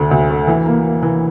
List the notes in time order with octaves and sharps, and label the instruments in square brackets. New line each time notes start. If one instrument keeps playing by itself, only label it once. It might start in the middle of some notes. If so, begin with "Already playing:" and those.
Already playing: [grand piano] D2 D3
D2
A3
E3
A#3
A#3
E3